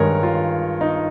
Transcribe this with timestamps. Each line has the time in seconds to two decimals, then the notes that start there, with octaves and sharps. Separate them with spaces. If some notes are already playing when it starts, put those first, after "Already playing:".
Already playing: G2 D#3 G#3 A#4 C#5
0.23 F4
0.81 D#4